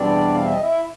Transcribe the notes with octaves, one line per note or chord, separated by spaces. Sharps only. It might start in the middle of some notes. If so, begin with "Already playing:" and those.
Already playing: E2 B2 G3 C4 D4 D5
F5
E5
D#5
E4 E5